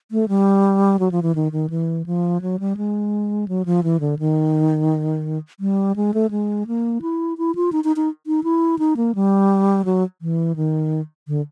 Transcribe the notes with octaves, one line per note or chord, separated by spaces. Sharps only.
A3
G3
F#3
F3
E3
D#3
D#3
E3
F3
F#3
G3
G#3
F#3
F3
E3
D3
D#3
G3
G#3
A3
G#3
A#3
E4
E4
F4
D#4
D#4
D#4
D#4
E4
D#4
A#3
G3
F#3
E3
D#3
D3